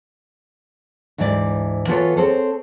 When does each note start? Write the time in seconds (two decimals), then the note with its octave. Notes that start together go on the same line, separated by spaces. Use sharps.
1.18 D2 G#2 E3 G4 D5
1.88 E3 B3 F4 F#4 A4 C#5
2.17 C4 G#4 A4 C5 C#5